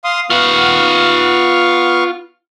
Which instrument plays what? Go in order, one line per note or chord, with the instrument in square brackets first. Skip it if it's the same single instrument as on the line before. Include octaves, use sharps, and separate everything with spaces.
[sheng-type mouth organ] F5 C6 D#6
[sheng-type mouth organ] B3 F5 C#6 [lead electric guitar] F4 F#5